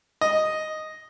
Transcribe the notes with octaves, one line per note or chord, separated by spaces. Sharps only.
D#5